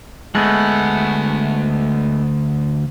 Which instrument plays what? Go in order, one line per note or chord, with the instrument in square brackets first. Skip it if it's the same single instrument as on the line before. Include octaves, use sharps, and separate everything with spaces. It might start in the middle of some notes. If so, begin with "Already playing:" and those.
[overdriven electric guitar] D2 F#5 [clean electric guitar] G#3 A3 B3